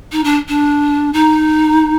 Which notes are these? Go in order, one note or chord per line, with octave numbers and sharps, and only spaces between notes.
D#4
D4
D4
D#4